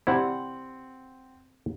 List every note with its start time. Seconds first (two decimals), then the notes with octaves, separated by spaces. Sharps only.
0.07 C3 G3 C4 E4 F#5